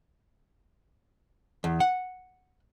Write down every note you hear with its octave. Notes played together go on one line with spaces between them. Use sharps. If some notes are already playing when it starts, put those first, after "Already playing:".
E2
F#5